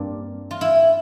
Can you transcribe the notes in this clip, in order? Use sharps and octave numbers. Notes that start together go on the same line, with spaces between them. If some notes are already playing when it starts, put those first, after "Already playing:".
Already playing: G2 A#3 C4 D4
F4
E4